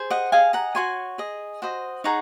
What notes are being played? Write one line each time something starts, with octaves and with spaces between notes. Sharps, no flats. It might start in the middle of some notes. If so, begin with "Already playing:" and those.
Already playing: G#4 C5
D#5 F#5
G#4 D#5 F5 G#5
F#5 A#5
F#4 C#5 G#5 C6
G#4 D#5
F#4 C5 D#5
D#4 G#4 C#5 F#5 A#5